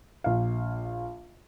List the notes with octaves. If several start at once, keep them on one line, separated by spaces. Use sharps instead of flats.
A#1 F5